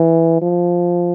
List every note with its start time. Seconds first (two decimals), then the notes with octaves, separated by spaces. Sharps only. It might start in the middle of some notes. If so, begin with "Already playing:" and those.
Already playing: E3
0.42 F3